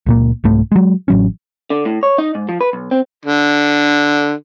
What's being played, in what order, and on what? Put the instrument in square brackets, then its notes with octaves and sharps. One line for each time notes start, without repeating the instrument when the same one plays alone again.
[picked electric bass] C#2 A#2 A#3
C2 G#2 A3
F#3 G#3
A1 F#3 C#4
[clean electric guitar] D3
A2
C#5
D#4
G#2
F3
B4
B1
C4
[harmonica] D3